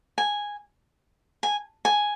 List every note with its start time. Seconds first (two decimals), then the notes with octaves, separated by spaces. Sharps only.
0.18 G#5
1.43 G#5
1.85 G#5